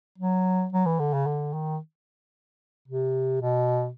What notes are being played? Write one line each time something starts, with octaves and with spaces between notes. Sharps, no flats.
F#3
F#3
E3
D3
C#3
D3
D#3
C3
B2